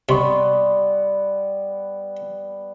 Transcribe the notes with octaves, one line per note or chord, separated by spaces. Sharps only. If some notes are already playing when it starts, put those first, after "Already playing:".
C3 G3 B3 D#5 C6 C#6